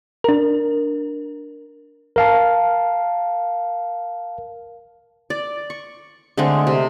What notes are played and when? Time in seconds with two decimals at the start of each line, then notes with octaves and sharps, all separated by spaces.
0.24 D4 A#4
2.16 A#4 F5 A5
5.30 D5
5.70 C#6
6.37 D3 G#3 A3 C4
6.67 C3